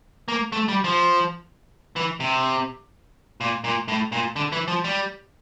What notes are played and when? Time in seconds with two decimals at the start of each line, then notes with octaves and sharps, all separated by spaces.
0.28 A#3
0.52 A3
0.68 G3
0.84 F3
1.96 E3
2.20 C3
3.41 A#2
3.64 A#2
3.88 A2
4.12 A#2
4.36 D3
4.52 E3
4.68 F3
4.84 G3